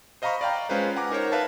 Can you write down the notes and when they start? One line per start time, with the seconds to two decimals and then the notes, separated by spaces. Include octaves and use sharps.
0.22 C5 D#5 F5 A#5 B5 C#6
0.41 D5 F5 G5 A#5
0.69 G#3 C#4 F4 B4 C5 F5
0.96 F#5 G#5 A#5 D6
1.10 D#4 A#4 C5 C#5
1.32 B4 E5 F5 A5